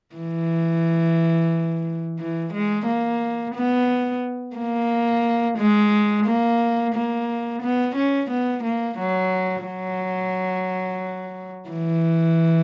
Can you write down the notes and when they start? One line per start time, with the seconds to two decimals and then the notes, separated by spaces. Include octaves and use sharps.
0.16 E3
2.18 E3
2.53 G#3
2.86 A#3
3.55 B3
4.56 A#3
5.58 G#3
6.26 A#3
6.94 A#3
7.62 B3
7.95 C#4
8.30 B3
8.63 A#3
8.98 F#3
9.66 F#3
11.70 E3